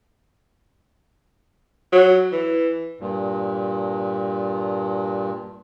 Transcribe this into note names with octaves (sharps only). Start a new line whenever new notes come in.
F#3
E3
G2 A#2